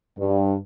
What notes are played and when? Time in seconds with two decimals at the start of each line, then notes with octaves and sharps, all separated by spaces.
0.18 G2